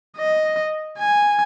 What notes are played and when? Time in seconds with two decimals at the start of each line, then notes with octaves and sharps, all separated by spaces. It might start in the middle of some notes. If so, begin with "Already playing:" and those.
0.17 D#5
0.98 G#5